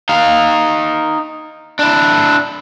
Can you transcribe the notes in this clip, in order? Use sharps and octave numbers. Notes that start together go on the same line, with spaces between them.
D#4 F5
D4 E4